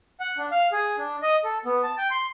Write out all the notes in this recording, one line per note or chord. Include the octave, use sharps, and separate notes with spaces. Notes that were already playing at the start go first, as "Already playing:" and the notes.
F#5
D4
F5
G#4
D4
D#5
A4
B3
A5
G5
C6